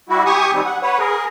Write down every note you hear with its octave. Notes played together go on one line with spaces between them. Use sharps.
G3 E4 F#4
G4 G#5 C#6 D#6
D#3 G3 C4
F#5
B4 C#5 F#5
G#4 A#4